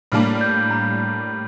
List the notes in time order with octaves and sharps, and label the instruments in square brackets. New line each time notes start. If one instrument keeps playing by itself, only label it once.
[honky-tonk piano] A2 G3 A#3 D4 [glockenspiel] F6
[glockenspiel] G6
A#5